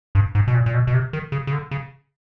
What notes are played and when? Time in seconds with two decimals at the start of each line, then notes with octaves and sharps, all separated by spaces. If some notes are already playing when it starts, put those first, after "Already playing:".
0.15 G2
0.35 G#2
0.48 B2
0.55 A#2
0.66 A#2
0.74 B2
0.87 B2
0.94 C3
1.13 D#3
1.32 C#3
1.47 C#3
1.53 D3
1.71 C#3